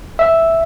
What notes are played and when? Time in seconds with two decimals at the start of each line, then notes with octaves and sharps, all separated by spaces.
0.19 E5